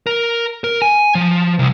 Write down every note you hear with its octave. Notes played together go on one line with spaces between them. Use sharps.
A#4
A#4
G#5
F3
C2